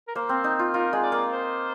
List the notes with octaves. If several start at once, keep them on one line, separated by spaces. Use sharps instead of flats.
A#4
A#3 C5
C4
D#4
F4
F4 A#4
G#3
D5
A#3
C5